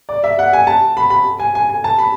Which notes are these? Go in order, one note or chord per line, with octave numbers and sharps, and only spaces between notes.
D5
E5
F#5
G#5
A5
B5
B5
G#5
G#5
G#5
A5
B5